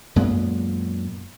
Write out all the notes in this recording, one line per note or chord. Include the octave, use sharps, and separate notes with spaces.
F#2 A#2 G#3 B3